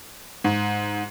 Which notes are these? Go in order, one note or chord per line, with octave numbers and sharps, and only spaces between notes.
G#2